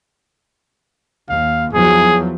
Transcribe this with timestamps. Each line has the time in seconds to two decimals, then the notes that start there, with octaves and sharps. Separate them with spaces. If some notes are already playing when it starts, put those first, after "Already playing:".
1.29 D#2 F5
1.73 E2 F3 F#3 G#4